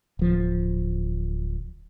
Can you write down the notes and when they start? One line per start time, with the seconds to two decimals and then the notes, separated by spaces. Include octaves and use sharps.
0.19 D1 F3